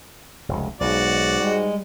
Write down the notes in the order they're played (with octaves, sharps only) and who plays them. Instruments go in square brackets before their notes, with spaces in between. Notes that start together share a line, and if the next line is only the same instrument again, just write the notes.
[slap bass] F1 C#2
[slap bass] B1 [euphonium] G#2 [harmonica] F#4 D5
[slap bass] G3 [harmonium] G#3